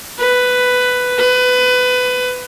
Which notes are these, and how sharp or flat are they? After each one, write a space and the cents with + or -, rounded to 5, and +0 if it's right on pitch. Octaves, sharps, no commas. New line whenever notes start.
B4 +10
B4 +20